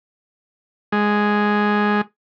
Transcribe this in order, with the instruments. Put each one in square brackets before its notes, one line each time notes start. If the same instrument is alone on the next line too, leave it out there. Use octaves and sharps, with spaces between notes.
[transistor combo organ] G#3